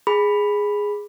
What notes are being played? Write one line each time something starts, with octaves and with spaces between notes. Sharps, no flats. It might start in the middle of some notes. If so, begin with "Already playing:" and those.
G#4 B5